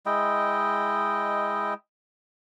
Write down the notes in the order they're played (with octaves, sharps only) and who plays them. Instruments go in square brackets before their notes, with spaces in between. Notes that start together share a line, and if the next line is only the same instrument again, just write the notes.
[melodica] G#3 E4 D#5 G5